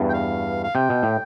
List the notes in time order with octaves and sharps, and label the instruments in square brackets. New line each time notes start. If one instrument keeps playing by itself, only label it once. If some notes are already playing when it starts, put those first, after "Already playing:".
Already playing: [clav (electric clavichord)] E2 G2
[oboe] G5
F5
F5
[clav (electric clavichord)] C3 [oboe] G5
[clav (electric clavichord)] B2
A2